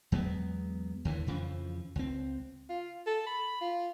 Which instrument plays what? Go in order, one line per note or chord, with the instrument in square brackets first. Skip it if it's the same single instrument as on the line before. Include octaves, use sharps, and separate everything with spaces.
[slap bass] E2 F#3 G#3 B3
D#2 D3 E3
F2 C#3 E3 F3
C#2 C4
[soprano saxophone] F4
A4
B5
F4